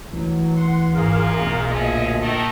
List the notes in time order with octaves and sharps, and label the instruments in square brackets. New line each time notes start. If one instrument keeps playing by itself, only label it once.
[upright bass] D2 [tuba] E3 [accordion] F#3
[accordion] F#5 C6
[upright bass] G#1 [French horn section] F#2 A#2 [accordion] G#4 A#4 F5
[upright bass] B1 B3
[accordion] D2 D#5 E5 [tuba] A#2 [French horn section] F3 C#4 G#4
[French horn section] D#3 A3